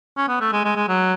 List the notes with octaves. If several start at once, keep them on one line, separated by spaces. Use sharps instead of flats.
C#4
B3
A3
G#3
G#3
G#3
F#3